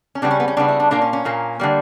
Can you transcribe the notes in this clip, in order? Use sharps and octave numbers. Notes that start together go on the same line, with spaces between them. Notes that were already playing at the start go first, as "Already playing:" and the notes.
C#4
C#3 G3 B3 D4
C#4
B3
C#4
C#3 G3 B3 D4
E4
D4
A#2 A#3 D4
C#4
C#4
A#2 A#3
D3 G3 A#3